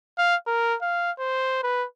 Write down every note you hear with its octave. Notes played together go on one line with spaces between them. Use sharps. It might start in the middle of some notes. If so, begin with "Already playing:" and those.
F5
A#4
F5
C5
B4